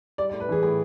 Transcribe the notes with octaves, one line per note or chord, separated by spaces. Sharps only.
G3 D5
D5
A2
B4
E3 G#4
A2 G#4